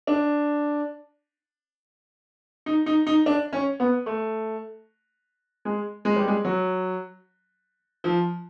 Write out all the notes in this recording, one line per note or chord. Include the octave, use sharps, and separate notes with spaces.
D4
D#4
D#4
D#4
D4
C#4
B3
A3
G#3
G#3
G3
G#3
F#3
F3